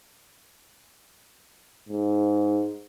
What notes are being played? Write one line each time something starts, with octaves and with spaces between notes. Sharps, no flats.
G#2